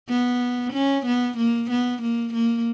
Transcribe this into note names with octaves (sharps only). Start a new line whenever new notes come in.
B3
C#4
B3
A#3
B3
A#3
A#3